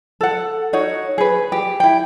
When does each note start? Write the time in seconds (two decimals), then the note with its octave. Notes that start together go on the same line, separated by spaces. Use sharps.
0.21 A4 F#5
0.73 D#4 F#4 C#5 F#5
1.18 G#4 B4
1.52 G4
1.80 E4 G5